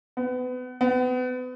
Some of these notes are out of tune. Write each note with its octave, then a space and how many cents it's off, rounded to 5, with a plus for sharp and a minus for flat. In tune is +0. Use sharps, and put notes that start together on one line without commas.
B3 +30
B3 +35